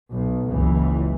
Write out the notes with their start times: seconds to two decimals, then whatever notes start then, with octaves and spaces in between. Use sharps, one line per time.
0.11 B1
0.50 F#1 C#2 E3